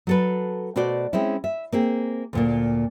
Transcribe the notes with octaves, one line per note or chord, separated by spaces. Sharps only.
F#3 A4 B4
B2 A3 F#4 C5 D5
G#3 C4 C#4 E4
E5
A#3 C4 G#4
D2 A#2 A#3